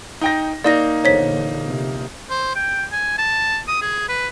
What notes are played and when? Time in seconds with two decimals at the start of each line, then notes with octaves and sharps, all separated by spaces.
0.21 D#4 G5 A#6
0.64 A#3 D#4 D5 A#6
1.04 A#1 E2 D3 C5 C#5 B6
1.64 A#1 C3
2.30 C5
2.55 G5
2.92 G#5
3.18 A5
3.68 D#6
3.82 G#4
4.09 B4